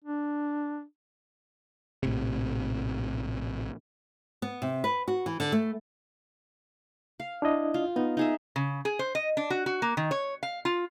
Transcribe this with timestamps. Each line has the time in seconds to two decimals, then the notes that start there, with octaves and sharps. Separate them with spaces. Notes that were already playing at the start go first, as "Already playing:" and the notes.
0.04 D4
2.03 A#1 A2 C3
4.42 B3
4.62 C3
4.84 B4
5.08 F#4
5.26 E3
5.40 D3
5.52 A3
7.20 F5
7.42 D4 E4 D#5
7.74 F4
7.96 B3 D#4
8.17 D#4 G#4 E5
8.56 C#3
8.85 G#4
8.99 C5
9.15 D#5
9.37 D4
9.50 F#4
9.66 F#4
9.82 A#3
9.97 D#3
10.11 C#5
10.43 F5
10.65 F4